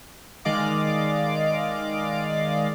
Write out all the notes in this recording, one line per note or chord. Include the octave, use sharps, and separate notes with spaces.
D#3 G#3 D5 D#5 F5 D6